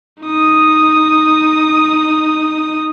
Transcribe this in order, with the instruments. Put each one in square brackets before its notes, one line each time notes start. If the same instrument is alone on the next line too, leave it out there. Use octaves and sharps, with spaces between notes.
[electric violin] D#4 D#6